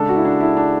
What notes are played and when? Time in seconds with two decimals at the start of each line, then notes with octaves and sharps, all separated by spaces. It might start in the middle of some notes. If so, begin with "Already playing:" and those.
Already playing: C#3 G#3 D4 A4
0.09 F#4
0.16 E4
0.25 D4
0.41 E4
0.57 D4